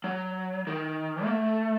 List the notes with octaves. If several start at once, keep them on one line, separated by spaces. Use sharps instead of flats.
F#3
D#3
A#3
A3